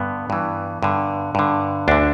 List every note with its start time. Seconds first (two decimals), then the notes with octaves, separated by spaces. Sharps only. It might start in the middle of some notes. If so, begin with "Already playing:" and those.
Already playing: G2 D3 B3
0.30 G2 E3
0.83 G2 D3
1.35 G2 D3
1.88 D2 D3 D4